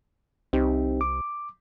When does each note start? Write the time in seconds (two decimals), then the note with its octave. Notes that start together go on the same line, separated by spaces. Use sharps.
0.53 C2 C4 D#4 G4
1.01 D6